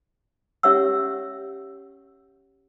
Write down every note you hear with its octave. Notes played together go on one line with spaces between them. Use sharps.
C#4 G4 C#5 E5 F#5 E6